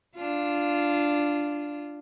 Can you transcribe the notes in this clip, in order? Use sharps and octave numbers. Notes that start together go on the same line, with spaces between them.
D4 F4